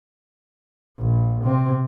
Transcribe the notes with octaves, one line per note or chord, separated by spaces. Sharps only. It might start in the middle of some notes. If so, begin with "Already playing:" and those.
A#1
C3 C4